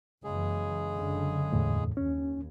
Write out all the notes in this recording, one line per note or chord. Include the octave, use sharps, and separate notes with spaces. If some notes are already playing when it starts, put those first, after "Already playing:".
F#1 C#3 E3 G#3 G#4
F#1 D3
E2 A2
D#2 C#4